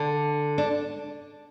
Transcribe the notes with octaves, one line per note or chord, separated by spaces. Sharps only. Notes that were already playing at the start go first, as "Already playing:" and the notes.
Already playing: D3
D4